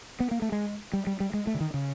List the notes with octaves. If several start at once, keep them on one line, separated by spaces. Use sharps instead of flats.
B3
A#3
A3
G#3
G3
G3
G3
G#3
A3
D3
D#3
C#3